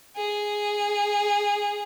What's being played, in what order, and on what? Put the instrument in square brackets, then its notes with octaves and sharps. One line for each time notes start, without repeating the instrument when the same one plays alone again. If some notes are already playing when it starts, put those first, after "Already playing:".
[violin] G#4